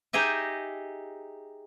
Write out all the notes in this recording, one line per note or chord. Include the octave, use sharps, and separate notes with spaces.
D#4 G4 G#4 D#5 E5